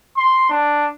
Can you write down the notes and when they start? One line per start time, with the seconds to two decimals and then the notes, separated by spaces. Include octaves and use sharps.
0.17 C6
0.49 D4